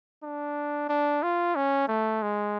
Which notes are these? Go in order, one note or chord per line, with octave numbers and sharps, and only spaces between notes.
D4
D4
F4
C#4
A3
G#3